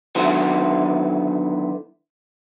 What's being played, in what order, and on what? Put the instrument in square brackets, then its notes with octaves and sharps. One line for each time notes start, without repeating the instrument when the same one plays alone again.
[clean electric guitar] D3 D#3 F#3 B3 E4 C5